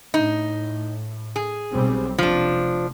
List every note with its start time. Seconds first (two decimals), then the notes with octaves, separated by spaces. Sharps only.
0.14 A2 D#4
1.36 G#4
1.71 B1 G3 C4
2.18 F1 F3 D4